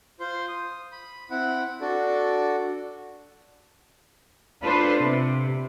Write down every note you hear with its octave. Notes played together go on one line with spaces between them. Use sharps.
F4 C5 C6
D#6
B5
C4 E4 F#5 B5
D4 F#4 A4
D4 F4 A4 B4 C5
C3